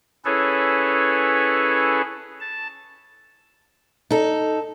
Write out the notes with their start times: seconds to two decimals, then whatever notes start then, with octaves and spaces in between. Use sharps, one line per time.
0.25 C#4 E4 G#4 A4 B4 C#5
2.40 A5
4.11 D#4 A4